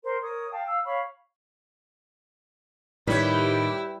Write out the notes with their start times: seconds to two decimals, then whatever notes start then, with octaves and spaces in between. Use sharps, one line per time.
0.03 A#4 C5
0.21 A#4 C#5 D#6
0.52 F5 G5 A5
0.65 F5 E6
0.85 C#5 F5 B5 C#6
3.07 A2 D#3 G3 E4 B4 C#5 G5